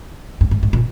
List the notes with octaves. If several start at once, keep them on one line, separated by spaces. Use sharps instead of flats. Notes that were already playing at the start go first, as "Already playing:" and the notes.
G2
G#2
G#2
A#2